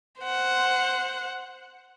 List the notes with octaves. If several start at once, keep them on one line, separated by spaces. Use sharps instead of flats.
C5 F#5